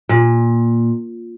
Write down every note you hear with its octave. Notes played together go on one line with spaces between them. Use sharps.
A#2